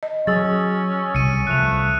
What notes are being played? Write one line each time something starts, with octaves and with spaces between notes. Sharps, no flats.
D#5
F#3 C#4 G#4 D#6 E6 A6
C2 C#7 D#7
C2 F3 A3 F#6 F7